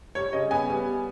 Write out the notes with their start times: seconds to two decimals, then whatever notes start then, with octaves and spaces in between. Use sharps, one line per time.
0.15 G3 C#5
0.33 C#3 D#5
0.51 B3 G#5
0.69 G3